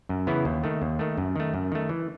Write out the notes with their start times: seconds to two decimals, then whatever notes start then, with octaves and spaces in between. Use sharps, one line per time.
0.09 F#2
0.27 C#3 E3 B3 E4
0.45 D#2
0.64 D#3 A3
0.82 D#2
0.99 D#3 A3
1.18 F#2
1.36 D#3 A3
1.54 F#2
1.72 D#3 A3
1.89 E3